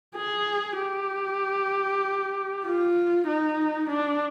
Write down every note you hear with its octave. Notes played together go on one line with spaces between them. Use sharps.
G#4
G4
F4
D#4
D4